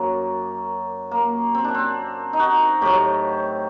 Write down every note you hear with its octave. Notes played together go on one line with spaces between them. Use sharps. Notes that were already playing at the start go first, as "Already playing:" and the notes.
Already playing: F#2 F#3 A#3
A#3
C4
D4
C4
D#4
F#4
A2 F#3 G4